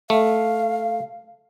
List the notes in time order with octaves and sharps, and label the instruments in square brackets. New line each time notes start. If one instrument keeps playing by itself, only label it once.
[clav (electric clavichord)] A3 [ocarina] F5